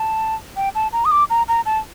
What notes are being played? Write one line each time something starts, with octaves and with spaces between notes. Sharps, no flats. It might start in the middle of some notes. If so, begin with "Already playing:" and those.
Already playing: A5
G5
A5
A#5
D#6
D6
A#5
A#5
A5